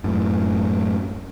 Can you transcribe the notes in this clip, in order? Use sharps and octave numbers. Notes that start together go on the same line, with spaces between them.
F#2 A2